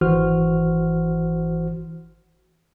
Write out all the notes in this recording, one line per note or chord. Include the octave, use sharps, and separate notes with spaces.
G#1 E3 F#4 C5 F6